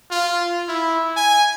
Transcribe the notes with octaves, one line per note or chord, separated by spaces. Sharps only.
F4
E4
G#5